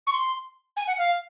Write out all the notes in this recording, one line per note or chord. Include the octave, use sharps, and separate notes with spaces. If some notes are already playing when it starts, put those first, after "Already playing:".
C#6
C6
G#5
F#5
F5